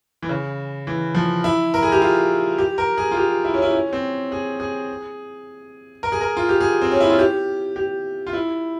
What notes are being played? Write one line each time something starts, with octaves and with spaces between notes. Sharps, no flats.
E3
C#3
E3
F3
E4
A#4
G#4
G4
F4
G4
A#4
G#4
F4
G4
E4
C#4
E4
C#4
C4
G#4
G#4
A#4
G#4
A#4
F4
G4
G#4
C4
C#4
E4
F4
G4
G4
F4
E4